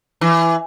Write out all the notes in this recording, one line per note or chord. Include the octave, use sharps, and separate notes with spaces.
E3